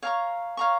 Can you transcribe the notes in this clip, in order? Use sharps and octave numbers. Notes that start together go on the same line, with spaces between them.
C#5 F5 A#5 C#6
C#5 F5 A#5 C#6